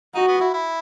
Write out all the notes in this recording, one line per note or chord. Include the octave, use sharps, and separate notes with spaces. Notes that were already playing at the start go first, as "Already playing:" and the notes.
D#4 F#4
B3
E4
E4